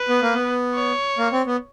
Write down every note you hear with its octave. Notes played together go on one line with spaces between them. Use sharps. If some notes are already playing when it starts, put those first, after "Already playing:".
Already playing: B4
B3
A#3
B3
C#5
A#3
C4
B3